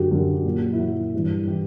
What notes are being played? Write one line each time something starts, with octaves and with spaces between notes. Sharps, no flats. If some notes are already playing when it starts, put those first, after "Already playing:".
Already playing: F#2 D3 F#3 F#4 G4
F#2 D3 F#3 F#4
A#2 F#3
E4
A#2 F#3 F#4
G2 E3 G3
E3 G4